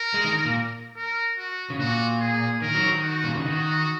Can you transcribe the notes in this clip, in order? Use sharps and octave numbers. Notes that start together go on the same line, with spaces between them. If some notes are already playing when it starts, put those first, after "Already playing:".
Already playing: A#4
G#3
D#3
A#2
A#4
F#4
C#3
A#2 F#4
G#4
D#3 A#4
F#3
D#3
F#4
A#2
C#3
D#3 F#4